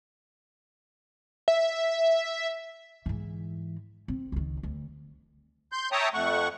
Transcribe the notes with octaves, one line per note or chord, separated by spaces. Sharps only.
E5
G#2 E3
C4
C#2 D#3
D2
C6 G6
C#5 E5 G5 A5 A#5 D#6
F2 A3 F#5 C#6